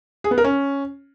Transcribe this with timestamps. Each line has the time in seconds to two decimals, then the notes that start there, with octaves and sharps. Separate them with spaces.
0.24 G#4
0.31 B3
0.38 A#4
0.44 C#4